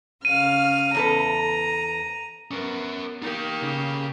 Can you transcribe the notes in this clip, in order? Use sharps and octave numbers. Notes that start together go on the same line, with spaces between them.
C#3 F5 F6 D#7
E2 A4 B4 A#5
B3 C#4 A#4
A#3 D#4 G4 G5
C#3